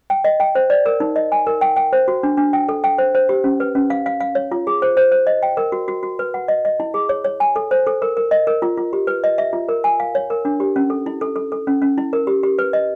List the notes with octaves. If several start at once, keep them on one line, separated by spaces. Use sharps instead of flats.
G5
D#5
G5
C5
D5
A#4
D#4
D#5
G#5
A#4
G5
G5
C5
F#4
D4
D4
G5
A4
G5
C5
C5
G4
C#4
B4
C#4
F5
F5
F5
C#5
F4
G#4
C5
C5
C5
D#5
G5
A#4
F#4
F#4
F#4
B4
F#5
D#5
D#5
E4
G#4
C#5
C#5
G#5
A4
C5
A4
A#4
A#4
D#5
A#4
F4
F4
G4
B4
D#5
E5
F4
A#4
G#5
F5
C#5
A#4
D4
G4
C#4
A4
E4
A4
A4
A4
C#4
C#4
E4
A#4
G4
G4
B4
D#5